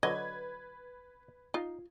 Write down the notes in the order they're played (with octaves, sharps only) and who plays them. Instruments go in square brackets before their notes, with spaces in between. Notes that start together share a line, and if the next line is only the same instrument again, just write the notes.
[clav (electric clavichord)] D3 F#3 [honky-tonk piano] B4 G#6 [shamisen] D#5
[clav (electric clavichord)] D#4 [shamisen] F4